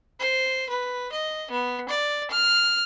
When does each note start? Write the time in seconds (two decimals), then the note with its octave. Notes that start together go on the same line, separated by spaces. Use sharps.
0.20 C5
0.69 B4
1.13 D#5
1.51 B3
1.89 D5
2.31 F6